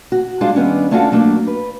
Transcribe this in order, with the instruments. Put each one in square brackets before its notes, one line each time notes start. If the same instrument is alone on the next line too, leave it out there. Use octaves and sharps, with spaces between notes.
[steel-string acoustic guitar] F#4
G3 G#3 D4 F4 G#4
D#3 G3 B3 C#4 D4
A3 C#4 D4 F4 F#4 A4
F#3 A3 A#3 D4
B4